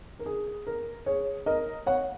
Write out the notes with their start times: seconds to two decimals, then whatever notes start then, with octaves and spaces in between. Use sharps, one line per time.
0.19 A#4
0.26 G#4
0.67 A#4
1.06 G#4 C#5
1.46 A#4 D#5
1.86 C#5 F#5